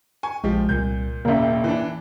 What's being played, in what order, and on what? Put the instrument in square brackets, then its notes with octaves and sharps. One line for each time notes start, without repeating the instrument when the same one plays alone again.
[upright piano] G#5 C#6
[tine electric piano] A#1 G#3 [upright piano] F3 G4
[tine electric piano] C2 [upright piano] A#2 G6
[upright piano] E1 A1 [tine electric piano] A#3 E5
[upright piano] E3 D4